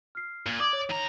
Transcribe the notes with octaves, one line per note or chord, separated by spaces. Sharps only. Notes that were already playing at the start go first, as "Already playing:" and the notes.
F6 C7
A#2
D5 D6 D#6 G#6
C#5
D#2 A#5